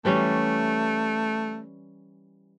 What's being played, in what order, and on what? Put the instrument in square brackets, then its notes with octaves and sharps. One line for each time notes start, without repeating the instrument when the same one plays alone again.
[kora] E3 G3 C#4 [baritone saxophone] A3